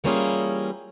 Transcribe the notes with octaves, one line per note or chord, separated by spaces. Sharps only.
E3 G3 A#3 C#4 F4 G#4